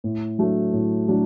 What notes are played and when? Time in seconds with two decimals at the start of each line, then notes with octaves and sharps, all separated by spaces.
0.04 A2
0.39 F#3 A3 D4
0.73 A2
1.08 F#3 A3 D4